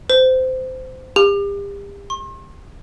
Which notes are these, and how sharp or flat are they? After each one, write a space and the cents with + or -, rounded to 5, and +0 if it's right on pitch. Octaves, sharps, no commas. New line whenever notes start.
C5 -20
G4 +35
C6 +40